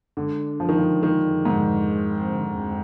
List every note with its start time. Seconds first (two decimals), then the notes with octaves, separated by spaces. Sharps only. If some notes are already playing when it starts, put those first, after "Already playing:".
0.17 D3 G#3
0.38 D4
0.59 D3 F3
0.69 D#3
0.78 F2 F3
1.03 D#3 G#3
1.24 D4
1.45 G#2 D3
1.68 F2
1.90 G#3
2.11 C4
2.32 D3
2.53 D2